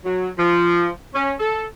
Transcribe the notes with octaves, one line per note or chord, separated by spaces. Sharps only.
F#3
F3
C#4
A4